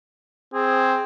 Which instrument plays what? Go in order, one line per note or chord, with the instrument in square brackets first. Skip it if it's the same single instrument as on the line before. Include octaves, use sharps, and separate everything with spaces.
[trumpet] C4 [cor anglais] G#4